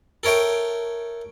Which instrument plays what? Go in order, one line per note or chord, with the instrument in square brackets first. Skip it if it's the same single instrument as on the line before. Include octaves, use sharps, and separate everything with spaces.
[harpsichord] A4 A#4 C#5 E5 G5